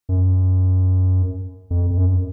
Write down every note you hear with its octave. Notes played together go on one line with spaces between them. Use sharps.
F#2
F2
F2
F#2